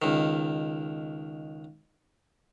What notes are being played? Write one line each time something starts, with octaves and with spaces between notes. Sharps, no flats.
C#2 D#3